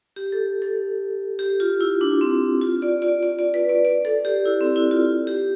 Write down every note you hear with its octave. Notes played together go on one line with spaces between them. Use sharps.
G4
A4
A4
G4
F4
E4
D4
C4
F4
D5
D5
D5
D5
B4
D5
D5
A4
G4
E4
C4
E4
F4
G4